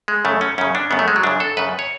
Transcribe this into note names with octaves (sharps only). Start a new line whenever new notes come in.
G#3
F#2 C#3 A3
C#4
F#2 C#3 C#4
D4
F#2 C#3 B3
A3
G#3
F#3
F#2 C#3 D4
A4
F#2 C#3 B4
C#5